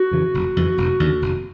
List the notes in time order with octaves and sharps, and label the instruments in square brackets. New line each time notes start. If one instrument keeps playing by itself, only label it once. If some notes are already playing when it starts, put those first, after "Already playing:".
Already playing: [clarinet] F#4
[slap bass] F2 C#3 E3
F1
F2 C#3 E3
F1
D#2 D3
F1